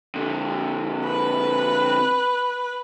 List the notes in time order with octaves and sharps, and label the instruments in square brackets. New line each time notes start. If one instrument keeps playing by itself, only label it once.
[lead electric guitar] F2 D3
[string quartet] B4